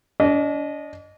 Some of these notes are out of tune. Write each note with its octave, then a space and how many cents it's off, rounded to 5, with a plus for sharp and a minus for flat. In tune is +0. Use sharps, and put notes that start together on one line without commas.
D4 -40 D#5 -15